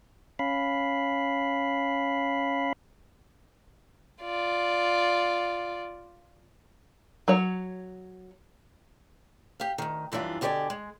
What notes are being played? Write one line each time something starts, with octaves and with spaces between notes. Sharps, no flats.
C#4 F5 B5
F4 D5
F#3 C#5
G4 F5
D2 D#3
F#2 E3 G3 D4 F4
B2 D3 G4 A#4 D5 G#5
G#3